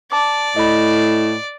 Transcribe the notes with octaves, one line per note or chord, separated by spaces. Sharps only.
D5 A5 D6
A2 D#5 B5